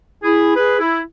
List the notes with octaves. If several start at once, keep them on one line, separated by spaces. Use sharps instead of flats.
E4 G#4
G#4 B4
E4